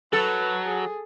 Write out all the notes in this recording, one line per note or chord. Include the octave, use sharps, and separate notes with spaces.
F#3 A4 B4
G#4